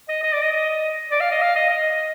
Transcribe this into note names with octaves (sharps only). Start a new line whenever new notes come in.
D#5
D#5
D5
D#5
D#5
D5
F5
D#5
F5
D#5
D#5